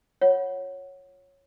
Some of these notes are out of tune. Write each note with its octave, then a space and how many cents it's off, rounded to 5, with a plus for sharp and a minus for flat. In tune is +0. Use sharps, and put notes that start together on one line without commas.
F4 +0 C#5 -5 F#5 +0